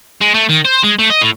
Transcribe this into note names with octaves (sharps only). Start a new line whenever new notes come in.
G#3
A3
D#3
C5
G#3
A3
D#5
A2